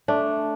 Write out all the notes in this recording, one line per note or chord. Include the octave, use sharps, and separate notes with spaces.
A3 D4